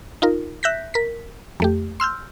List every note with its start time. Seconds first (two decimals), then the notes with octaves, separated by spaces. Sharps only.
0.22 D#4 F4 A#4
0.63 E5 F#6 G6 A#6 B6
0.94 A#4 B6
1.60 F2 A3 G4
2.00 C6 E6 F6 G6